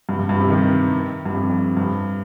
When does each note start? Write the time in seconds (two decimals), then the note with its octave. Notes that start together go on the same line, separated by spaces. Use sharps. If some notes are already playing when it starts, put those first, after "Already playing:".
0.09 G2
0.19 G2
0.29 G2
0.40 C3
0.50 D#3
1.26 G2
1.34 F2
1.49 F2
1.77 G2